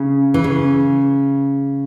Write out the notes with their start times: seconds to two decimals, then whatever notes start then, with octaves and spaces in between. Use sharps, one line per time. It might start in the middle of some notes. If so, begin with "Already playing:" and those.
Already playing: C#3
0.34 E3
0.44 C#3